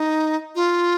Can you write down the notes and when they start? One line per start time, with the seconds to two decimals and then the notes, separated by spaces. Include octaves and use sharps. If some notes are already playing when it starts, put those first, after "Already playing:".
Already playing: D#4
0.55 F4